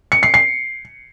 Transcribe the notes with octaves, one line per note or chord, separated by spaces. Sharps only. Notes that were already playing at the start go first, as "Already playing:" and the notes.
C#7
C7
C7